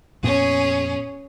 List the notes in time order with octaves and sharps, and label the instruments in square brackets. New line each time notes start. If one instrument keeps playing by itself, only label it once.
[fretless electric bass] F2 A#2 B3 [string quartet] C#4 G#4